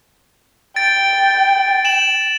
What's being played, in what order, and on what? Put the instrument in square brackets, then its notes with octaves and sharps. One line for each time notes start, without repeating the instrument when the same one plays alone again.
[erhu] G5 [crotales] A6 D7
[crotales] E7 F#7